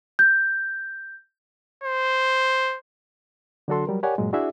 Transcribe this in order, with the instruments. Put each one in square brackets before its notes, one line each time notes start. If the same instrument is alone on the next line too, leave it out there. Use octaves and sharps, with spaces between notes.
[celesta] G6
[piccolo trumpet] C5
[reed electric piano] D3 F#3 D4 F#4 A4 C6
F#3 G3 A#4
G4 A#4 C#5 D5 F#5 G#5
G2 A#2 F#3 G#3
D4 E4 F#4 G#4 D5 E5